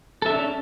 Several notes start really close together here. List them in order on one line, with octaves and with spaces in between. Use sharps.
A4 E5 D4 C#4